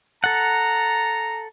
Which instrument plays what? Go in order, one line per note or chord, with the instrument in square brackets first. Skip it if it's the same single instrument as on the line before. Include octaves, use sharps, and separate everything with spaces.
[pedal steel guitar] A4 F#5 [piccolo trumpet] A#5